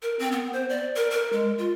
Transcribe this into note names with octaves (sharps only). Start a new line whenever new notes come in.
A#4
C4
B3
C5
D5
A#4
A#4
G#3
F4